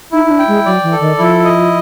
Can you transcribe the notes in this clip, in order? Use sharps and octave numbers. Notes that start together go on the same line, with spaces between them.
D#4 E4
D#4
D4
G5
G#3
F#3 D5
E3
A4
D#3
F3 E4
D#5